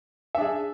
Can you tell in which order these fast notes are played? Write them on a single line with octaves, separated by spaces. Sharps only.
E5 D4 G#4